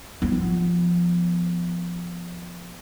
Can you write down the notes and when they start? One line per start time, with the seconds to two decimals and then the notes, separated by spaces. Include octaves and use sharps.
0.22 F3 B3